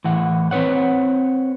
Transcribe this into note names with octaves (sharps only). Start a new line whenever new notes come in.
A2 E3 F#5
C4 B4 C#5 F#5